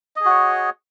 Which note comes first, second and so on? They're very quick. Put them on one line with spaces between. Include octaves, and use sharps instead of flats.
D#5 G#4 F#4 C#5